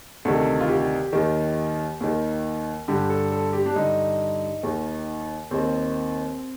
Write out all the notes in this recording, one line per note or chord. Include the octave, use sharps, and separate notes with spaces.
D2 C3 D#3 A4
F4
G4
D#2 D#3
D#2 D#3
G2 D3 G4
A4
A4
G4
D4
G2 D3 D#4
D#2 D#3
D#2 D#3 C4